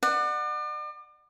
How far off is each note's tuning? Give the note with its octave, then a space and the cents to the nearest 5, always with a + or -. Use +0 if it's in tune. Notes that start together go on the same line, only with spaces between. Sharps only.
D5 +40 F#5 +0